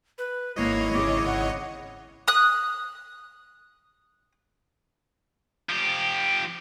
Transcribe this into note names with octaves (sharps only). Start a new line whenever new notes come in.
B4
G#1 A#3 E4 C#5 D#5
C#3 D6
F#5
D#6 F#6
F3 G4